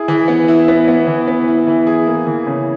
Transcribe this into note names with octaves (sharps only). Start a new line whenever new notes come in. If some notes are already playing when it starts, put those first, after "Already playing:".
Already playing: E4 G#4
E3
B3
E4
B3
B3
E3
B3
E4
E3
G#4
A#3
E3
C#3